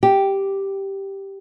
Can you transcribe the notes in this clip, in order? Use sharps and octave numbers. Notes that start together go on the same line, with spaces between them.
G4